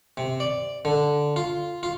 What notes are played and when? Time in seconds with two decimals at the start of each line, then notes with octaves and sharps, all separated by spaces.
0.17 C3
0.40 D5
0.85 D3
1.36 F4
1.83 F4